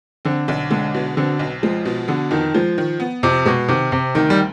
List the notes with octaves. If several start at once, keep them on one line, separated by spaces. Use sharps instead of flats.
D3 C4
B1 D3
D3 G#3
B2
D3 C4
B1
F3 G#3
B2
D3 B3
F2 D#3
F3 G#3
D#3
B3
F2 C3
B2 G#3
C3 D#3
C3 C4
D2 D#3
G3